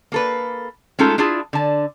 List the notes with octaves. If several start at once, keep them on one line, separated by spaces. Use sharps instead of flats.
A#3 A4 B4
G#3 A3 C#4 D#4 F4 A4
D4 E4 F4 G#4 A5
D3 A5